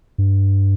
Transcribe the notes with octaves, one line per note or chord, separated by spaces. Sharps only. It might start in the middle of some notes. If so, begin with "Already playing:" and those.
G2